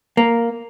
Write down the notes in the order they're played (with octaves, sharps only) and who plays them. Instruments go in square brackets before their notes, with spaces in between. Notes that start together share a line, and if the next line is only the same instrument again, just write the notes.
[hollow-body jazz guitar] A#3